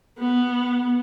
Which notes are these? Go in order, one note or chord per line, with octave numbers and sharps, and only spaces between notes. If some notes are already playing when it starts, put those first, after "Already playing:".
B3